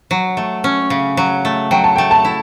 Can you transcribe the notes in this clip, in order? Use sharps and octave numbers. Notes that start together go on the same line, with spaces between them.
F#3
A3
C#4
C#3
F#3
A3
F#3 G5
A5
A3 G5
A5
E4